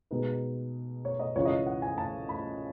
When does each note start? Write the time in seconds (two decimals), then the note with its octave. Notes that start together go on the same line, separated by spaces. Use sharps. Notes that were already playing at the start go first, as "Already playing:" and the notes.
0.11 B2 G#3 D#4 B4
1.05 C#5
1.19 D#5
1.35 C#2 C#3 E3 C#5
1.45 D#5
1.66 F#5
1.82 G#5
1.98 A5
2.29 B5